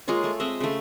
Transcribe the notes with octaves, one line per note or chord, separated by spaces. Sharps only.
G#3 A#3 F4 C#5
A3
G#3 C4 D#5 E5
C#3 A3